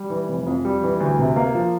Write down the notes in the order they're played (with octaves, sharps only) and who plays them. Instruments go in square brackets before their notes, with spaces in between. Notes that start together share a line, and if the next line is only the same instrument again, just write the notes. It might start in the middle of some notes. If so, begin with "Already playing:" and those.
Already playing: [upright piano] G3
E3
F1
F2
G3
E3
D2
C3
A#3
F3